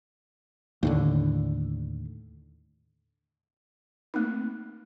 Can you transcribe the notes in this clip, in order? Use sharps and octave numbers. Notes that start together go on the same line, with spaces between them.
D#2 A2 D3
A3 A#3 C4 D#4